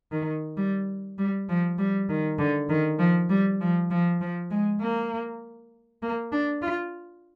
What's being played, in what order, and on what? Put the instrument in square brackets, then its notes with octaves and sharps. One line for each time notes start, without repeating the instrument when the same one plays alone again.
[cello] D#3
G3
G3
F3
G3
D#3
D3
D#3
F3
G3
F3
F3
F3
G#3
A#3
A#3
D4
F4